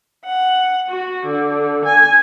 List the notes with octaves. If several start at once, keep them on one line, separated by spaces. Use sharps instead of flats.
F#5
F#4
D3
G#5